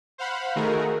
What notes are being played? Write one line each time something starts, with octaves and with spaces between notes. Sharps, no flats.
C5 F5 F#5 B5
D#3 A3 D#4 F#4 G#4 A#4